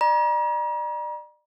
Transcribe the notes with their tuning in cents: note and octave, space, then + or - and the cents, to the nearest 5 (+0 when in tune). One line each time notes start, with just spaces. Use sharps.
D5 +40 A#5 +40